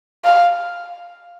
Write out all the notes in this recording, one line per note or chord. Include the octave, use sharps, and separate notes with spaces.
F5